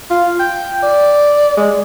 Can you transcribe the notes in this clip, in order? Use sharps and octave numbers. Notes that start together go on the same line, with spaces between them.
F4
G5
D5
G#3